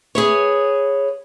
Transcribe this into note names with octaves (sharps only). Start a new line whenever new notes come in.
G#4 B4 C#5